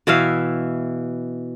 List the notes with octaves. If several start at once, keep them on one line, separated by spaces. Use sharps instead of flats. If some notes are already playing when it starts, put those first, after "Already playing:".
B2 E3 E5 F5